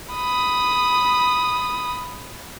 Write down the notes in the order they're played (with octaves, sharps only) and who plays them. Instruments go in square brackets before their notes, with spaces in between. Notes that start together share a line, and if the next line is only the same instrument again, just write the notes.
[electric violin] B5 D#6